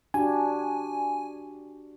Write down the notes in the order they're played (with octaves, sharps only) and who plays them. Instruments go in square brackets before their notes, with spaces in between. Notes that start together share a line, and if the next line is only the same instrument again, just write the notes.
[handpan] D4 F#4 G4 [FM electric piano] G#5